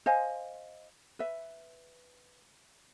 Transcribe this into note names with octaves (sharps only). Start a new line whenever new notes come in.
C5 D#5 F5 G#5
B4 E5